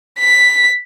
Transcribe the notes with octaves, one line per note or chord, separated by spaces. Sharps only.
B6